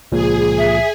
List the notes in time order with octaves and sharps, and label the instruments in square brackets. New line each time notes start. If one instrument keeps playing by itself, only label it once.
[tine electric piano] C#2 A#2 F3 [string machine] G#4
[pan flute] E5